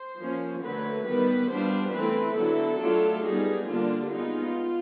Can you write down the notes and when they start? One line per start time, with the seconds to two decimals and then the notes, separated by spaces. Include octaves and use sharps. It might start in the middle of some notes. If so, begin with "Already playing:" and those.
Already playing: C5
0.19 F3 A#3 C#4
0.63 D3 F#3 A3 B4
1.06 D#3 G3 B3 B4
1.50 G3 B3 D4 F4 C5
1.93 E3 A3 C4 E4 B4
2.36 D3 F#3 B3 E4 A4
2.80 F#3 A3 D4 F4
3.24 G3 B3 D#4 G#4
3.67 D3 G3 A#3 D4 F4
4.11 G#3 B3 D#4 F4